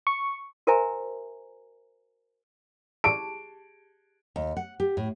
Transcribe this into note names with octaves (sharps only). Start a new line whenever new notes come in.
C#6
F#4 A#4 C5 E5 G#5 A#5
G4 G#4 A5 D7
D#2
F#5
G4
A2